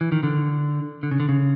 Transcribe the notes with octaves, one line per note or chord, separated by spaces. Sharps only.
E3
D#3
D3
D3
C#3
D3
C#3